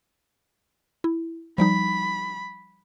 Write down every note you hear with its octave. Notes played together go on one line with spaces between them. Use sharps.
E4
F3 G3 D#4 B5